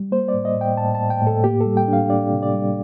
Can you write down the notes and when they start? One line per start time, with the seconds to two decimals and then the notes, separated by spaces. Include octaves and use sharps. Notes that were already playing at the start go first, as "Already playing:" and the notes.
Already playing: G3
0.12 A#3 C5
0.28 D5
0.34 A2
0.45 D#5
0.56 A2
0.61 G5
0.77 A2 A5
0.95 A5
1.00 A2
1.10 G5
1.22 A2 A4
1.44 A#3 G4
1.61 G3 A4
1.77 G5
1.88 D4 F5
2.10 D4 D5
2.32 C3
2.42 D5
2.54 G3